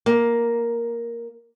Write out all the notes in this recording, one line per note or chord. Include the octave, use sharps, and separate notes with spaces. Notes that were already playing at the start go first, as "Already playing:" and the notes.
A#3